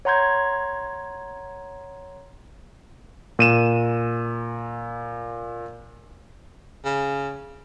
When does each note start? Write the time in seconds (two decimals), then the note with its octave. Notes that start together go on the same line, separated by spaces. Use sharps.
0.05 C#5 F#5 A#5 C6 G6 G#6
3.39 A#2 D#7 E7
6.85 C#3